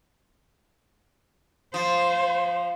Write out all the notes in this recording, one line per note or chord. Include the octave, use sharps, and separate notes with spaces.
F3 C5